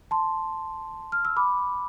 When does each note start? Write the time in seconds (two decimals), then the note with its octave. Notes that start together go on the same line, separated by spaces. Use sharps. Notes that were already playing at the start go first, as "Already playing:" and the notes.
0.11 A5 C6
1.12 F6
1.25 E6
1.36 B5 D6